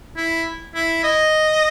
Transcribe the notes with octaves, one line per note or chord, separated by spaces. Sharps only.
E4
E4
D#5